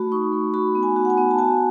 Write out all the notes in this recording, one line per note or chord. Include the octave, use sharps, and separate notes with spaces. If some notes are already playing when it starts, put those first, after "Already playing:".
Already playing: A3 F#4 B5
D#4 C#6
A3
F#4 B5
B3
G#5
F#4
F#5
G#5
B3
A5
F#4 G#5